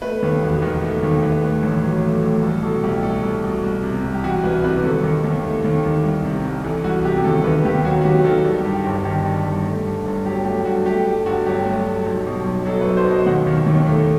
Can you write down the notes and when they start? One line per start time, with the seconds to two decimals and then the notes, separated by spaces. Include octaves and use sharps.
0.02 A3 B4
0.22 D#2
0.42 E1
0.62 D#3
0.83 A3
1.03 D#2
1.22 A3 B4
1.42 A2
1.63 A1
1.83 F#3
2.02 A3
2.22 A2
2.42 C2 A4
2.63 B2 A4
2.83 C2 G4
3.03 A3 A4
3.24 C2
3.43 B2
3.63 C2
3.83 C3
4.03 C2
4.14 G4
4.24 E3 F#4
4.44 C2 B4
4.64 C3 B4
4.84 D#2 A4
5.03 D#3
5.24 D#2
5.43 A3
5.64 D#2
5.84 D#3
6.04 C2
6.25 C3
6.45 C2
6.64 E3 A4
6.84 C2 F#4
7.04 C3 G4
7.24 D#2 A4
7.44 D#3 B4
7.65 D#2 G4
7.84 F#3 F#4
8.01 F#4
8.04 D#2 G4
8.24 D#3 A4
8.45 G3
8.60 G2 G4
8.74 G4
8.85 G1 G4
9.05 D#3 G4
9.25 G3
9.45 G2
9.66 A3
9.85 G2
10.06 G1
10.25 F#3 G4
10.45 A3 G4
10.65 G2 F#4
10.86 A3 G4
11.06 G2 G4
11.26 G1 F#4
11.46 F#3 G4
11.66 A3
11.86 G2
12.06 B1
12.27 B2
12.46 B1
12.66 F#3 A4
12.81 B4
12.86 B1
12.97 C5
13.06 B2 D#5
13.26 D#2 F#5
13.47 D#3
13.66 D#2
13.87 A3